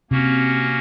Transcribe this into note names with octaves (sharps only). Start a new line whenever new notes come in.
C3 A#3 C#4 F#4